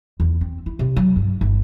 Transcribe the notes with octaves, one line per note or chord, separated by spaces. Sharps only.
E2
C4
E4
C3
F#3
G2
G1